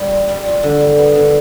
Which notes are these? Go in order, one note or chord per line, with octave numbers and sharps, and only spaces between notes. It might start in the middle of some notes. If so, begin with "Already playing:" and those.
Already playing: G3
F4
G3
F4
D3
G3
B3
D3